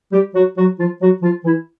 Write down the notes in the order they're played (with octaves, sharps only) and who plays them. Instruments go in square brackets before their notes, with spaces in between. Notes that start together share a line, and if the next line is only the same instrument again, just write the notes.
[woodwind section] G3 G4
F#3 F#4
F#3 F#4
F3 F4
F#3 F#4
F3 F4
E3 E4